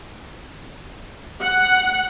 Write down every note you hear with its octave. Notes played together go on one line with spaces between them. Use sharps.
F#5